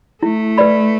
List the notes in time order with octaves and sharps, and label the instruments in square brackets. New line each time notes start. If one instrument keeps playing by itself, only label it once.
[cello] A3 [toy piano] E4
[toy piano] B4 D5 B5